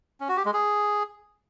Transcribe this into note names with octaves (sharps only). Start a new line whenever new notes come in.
C#4
F#4
G4
G#3
G#4